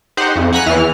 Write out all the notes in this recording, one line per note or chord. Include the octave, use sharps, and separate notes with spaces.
D#4 G4 C5 F#5
F2
F#5 G#5 A#5 B5 F#6
E2 E3 F6